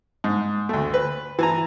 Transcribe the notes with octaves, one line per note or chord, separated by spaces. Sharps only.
G#2
D2 A3
B4
E3 G#5 A#5